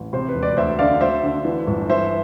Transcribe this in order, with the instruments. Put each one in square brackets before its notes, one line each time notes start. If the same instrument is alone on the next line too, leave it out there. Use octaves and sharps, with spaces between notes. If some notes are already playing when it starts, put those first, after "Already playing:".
Already playing: [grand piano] A1
C3 C5
B4
E1
B4 D5
D2 C5 E5
D3 D5 F5
D2 C5 E5
D3
E3
G1
E3 C5 E5